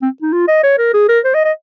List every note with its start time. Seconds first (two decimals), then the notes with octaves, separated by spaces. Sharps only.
0.02 C4
0.22 D#4
0.33 F4
0.48 D#5
0.64 C#5
0.78 A#4
0.94 G#4
1.09 A#4
1.25 C5
1.34 D#5
1.45 D#5